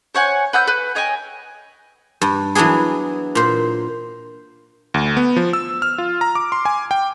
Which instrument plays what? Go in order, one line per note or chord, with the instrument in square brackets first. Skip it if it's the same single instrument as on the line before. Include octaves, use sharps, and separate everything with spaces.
[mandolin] C5 C#5 F#5 G#5
B4 F#5 E6 G6
B4
C#5 D#5 G5 G#5
[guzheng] G2
E3 F#3 B3 D4 G#4
A#2 C5
[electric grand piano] D2
B3
F3
E6
F6
F4
A#5
D6
C6
G#5
G5